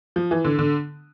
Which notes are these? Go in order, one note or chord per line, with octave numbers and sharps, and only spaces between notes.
F3
E3
D3
D3